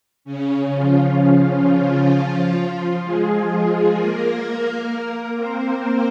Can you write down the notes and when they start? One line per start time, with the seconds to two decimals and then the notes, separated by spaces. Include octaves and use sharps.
0.25 C#3 C#4
0.71 F3 F4
3.03 G#3 G#4
3.96 A#3 A#4
4.90 A#3 A#4
5.36 C4 C5